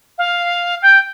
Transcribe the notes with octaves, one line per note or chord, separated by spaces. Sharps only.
F5
G5